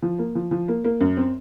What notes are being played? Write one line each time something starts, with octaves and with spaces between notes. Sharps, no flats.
F3
A#3
F3
F3
A#3
A#3
F#2
C4